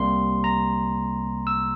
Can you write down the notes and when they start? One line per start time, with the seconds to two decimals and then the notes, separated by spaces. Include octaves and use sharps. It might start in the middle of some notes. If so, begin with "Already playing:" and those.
Already playing: C2 C3 G3 A#3 C6
0.44 A#5
1.47 E6